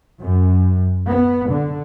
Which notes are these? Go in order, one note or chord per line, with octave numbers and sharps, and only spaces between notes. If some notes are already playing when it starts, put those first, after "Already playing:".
F#2
B3
D3